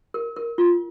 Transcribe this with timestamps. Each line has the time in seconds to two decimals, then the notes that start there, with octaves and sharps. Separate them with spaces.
0.14 A#4
0.36 A#4
0.58 F4